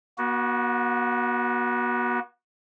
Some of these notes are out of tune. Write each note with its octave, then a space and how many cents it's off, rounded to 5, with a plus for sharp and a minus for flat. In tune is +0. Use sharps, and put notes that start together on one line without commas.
B3 -45 F#4 +0